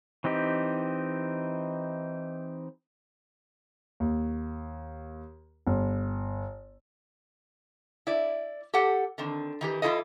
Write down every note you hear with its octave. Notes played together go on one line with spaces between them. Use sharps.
E3 C4 D#4 G4
D#2
G1
E4 D5
G4 A4 F#5
D3 D#3 C4
D#3 E3 G4
E3 F3 E4 F4 A4 D#5